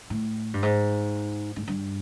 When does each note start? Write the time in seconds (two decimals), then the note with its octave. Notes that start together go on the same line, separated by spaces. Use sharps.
0.10 A2
0.54 G2
0.62 G#2
1.56 G#2
1.68 G2